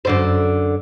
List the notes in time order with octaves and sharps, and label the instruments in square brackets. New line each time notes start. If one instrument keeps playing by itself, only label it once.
[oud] F#2 D3 C5